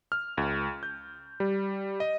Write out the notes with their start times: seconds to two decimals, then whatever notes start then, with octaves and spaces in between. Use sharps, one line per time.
0.12 F6
0.38 C#2
0.83 G6
1.40 G3
2.00 D#5